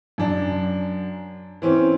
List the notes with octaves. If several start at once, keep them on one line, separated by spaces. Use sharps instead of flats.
F#2 D4
E3 C4 C#4